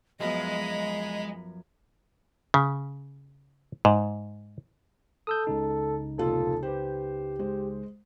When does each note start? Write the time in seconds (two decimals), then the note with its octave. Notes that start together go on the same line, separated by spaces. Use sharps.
0.20 F#2 F3 G#3 B3 D#5 A#5 B5
2.54 C#3
3.85 G#2
5.27 A4 D#6 E6 G6
5.47 C#2 C#3 D#4
6.18 F1 A#2 F4 A4
6.63 G4 B4 C5
7.39 G#3 C5